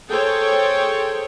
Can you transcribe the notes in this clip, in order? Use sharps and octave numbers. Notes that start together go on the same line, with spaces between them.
G#4 A4 C5 C#5 G5